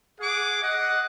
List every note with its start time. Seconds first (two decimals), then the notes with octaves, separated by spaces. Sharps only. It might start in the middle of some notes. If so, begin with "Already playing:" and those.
0.21 G#4 F#5 D6
0.63 D#5 F#5